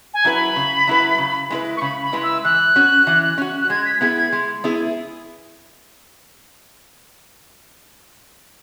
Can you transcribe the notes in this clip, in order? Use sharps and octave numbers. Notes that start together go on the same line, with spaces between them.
G#5
F#3 E4 B4
B5
C#3
F#3 E4 B4
C#3
G#3 E4 B4
C#6
C#3 B5
B5
G#3 E4 B4
E6
E3 F#6
C#4 F#4
E3
C#4 F#4
F#6
G#3 G#6
B6
B6
B3 E4 G#4 G#6
G#6
G#3
B3 E4 G#4